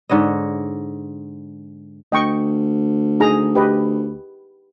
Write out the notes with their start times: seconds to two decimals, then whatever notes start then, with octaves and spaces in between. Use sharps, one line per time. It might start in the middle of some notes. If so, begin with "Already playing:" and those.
0.09 G#2 D3 C#5 D#5
2.12 D2 D#5 G5 C#6
3.20 D#4 G#4 A#5
3.55 G4 B4 D#5